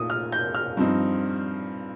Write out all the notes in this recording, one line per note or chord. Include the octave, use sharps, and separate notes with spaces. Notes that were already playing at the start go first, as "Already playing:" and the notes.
Already playing: A#2 A3 D#4 D#6
F6
G6
F6
G2 F3 C4 D#4